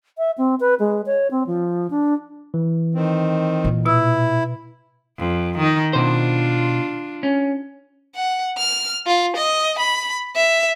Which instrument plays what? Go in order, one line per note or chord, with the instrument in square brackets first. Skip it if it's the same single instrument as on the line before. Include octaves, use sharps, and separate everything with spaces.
[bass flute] E5
C4
B4
G#3
C#5
C4
F3
D4
[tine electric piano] E3
[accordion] D#3 C4
[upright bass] A#2 A#3
[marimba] B2 E6 [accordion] E4
[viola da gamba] F2
D#3 D#4
[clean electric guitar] B2 C5 [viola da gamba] D4 F4
[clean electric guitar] C#4
[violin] F#5
F6
F4
D#5
B5
E5